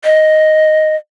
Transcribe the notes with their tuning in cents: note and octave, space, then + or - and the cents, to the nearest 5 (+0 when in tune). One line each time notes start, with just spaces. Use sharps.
D#5 +0